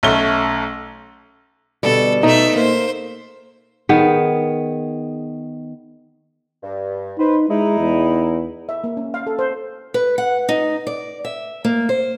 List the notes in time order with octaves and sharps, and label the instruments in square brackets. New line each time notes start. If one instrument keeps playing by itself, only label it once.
[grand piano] B1 A3 C#4 G7
[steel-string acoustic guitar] B2 D3 G3 [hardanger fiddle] A4
[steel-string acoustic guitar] B2 [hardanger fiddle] A3 E5 [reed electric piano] D#4
[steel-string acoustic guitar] A#3 [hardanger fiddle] C5
[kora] D#3 B3 G#4
[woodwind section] G2
[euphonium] D#4 [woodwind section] B4 C5
[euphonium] G#3 [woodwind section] D#4 E4
[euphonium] E2
[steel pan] E5
A#3
C#4
F5
A4
C5
[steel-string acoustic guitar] B4
F#5
D#4
D5
E5
A#3
C5